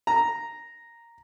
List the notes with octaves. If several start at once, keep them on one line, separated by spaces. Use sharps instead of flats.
A#5